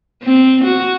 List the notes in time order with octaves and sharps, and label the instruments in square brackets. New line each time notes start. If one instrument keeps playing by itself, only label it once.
[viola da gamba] C4
F#4